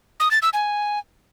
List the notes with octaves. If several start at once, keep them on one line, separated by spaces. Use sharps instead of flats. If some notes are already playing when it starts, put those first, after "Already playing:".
D#6
A6
E6
G#5